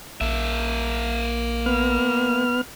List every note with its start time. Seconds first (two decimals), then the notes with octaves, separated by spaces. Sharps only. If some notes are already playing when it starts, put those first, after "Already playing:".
0.21 A#1 A#3 E5
1.66 B3 F6